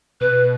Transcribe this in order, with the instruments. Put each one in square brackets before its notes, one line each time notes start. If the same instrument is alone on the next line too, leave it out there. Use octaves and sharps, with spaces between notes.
[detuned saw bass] B2 [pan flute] B4